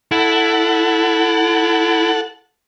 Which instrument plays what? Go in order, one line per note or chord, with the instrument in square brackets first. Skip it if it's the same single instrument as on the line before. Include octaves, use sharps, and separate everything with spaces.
[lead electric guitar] E4 [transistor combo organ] A4 F#5